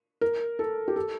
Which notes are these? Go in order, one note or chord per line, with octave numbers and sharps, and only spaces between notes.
A#4
A4
G4
A4